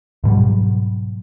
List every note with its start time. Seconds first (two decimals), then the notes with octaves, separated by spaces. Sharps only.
0.24 G#2 B2 F#3 G3